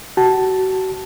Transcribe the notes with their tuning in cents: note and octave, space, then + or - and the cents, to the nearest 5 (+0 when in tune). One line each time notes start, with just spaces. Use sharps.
F#4 +30 A5 +0